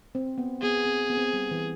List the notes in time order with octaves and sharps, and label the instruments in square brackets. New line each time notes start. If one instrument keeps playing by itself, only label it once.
[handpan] C4
B3
[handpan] B3 [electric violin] G#4
[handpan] C4
B3
C4
B3
G3
E3